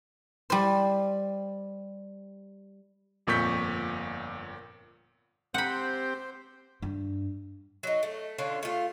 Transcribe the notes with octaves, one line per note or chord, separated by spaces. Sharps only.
G3 C5
G1 F2 A#2 C#6 G6 B6
C4 G4 C5 F#5 B5
G2
F#3 D#4
A3
D3 C#4 D4 F4
A3 F4